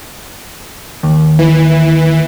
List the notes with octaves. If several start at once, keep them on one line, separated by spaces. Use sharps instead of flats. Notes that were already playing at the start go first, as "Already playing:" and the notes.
D#2
E3